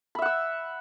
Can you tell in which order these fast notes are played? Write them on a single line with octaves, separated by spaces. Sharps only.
B5 E5 F#5 E6